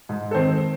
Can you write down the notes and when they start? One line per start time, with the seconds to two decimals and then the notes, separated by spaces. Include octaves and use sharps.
0.09 G#2
0.31 A4
0.35 D#3 C4 C5